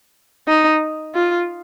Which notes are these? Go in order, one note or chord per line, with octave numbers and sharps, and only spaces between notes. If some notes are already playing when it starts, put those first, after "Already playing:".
D#4
F4